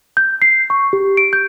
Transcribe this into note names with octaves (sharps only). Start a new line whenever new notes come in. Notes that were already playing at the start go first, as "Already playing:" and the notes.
G6
C7
C#6
G4
D7
G6